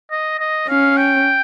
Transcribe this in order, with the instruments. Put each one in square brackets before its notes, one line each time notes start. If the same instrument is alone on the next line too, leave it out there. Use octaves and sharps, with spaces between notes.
[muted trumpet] D#5
D#5
[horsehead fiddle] C#4 [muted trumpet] F5
[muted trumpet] G5